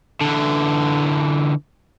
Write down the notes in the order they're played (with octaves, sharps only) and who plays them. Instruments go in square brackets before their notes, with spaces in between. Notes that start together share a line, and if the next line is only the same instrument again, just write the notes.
[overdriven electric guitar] D3 E3